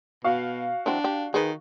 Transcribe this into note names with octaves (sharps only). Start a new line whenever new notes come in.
B2 F#4 F5
E3 F#3 C4 D4
G4
D#3 G#4 B4